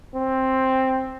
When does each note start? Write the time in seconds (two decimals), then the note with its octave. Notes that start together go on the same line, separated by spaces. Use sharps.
0.15 C4